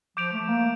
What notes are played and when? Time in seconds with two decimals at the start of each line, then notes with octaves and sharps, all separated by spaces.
0.17 F3 D6 G6 D7 F7
0.33 A3
0.48 A#3